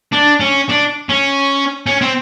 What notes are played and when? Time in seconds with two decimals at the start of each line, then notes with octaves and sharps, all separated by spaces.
0.12 D4
0.40 C#4
0.69 D4
1.09 C#4
1.87 C#4
2.01 C4